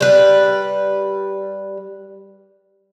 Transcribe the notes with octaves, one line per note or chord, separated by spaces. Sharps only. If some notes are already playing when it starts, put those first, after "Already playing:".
G3 B4